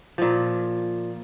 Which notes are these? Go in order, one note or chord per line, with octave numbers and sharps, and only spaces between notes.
A#2 F3